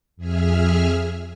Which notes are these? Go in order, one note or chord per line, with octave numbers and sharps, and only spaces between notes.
F2 G#4 E5 F6